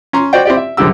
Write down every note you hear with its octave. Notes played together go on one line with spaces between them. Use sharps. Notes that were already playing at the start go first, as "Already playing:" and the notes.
C#4 A#5 C6
F#4 C5 D5 G5
C4 E4 G4 D5
E5
C2 F#2 D3 G#3 G4 E6